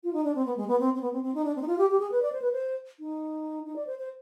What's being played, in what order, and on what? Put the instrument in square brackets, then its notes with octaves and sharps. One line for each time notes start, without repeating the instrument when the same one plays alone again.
[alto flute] F4
D#4
D4
C4
B3
G#3
B3
C4
C4
B3
C4
C4
D#4
D4
C4
D#4
F4
G4
G4
G#4
B4
D5
C5
B4
C5
D#4
D#4
D5
C5
C5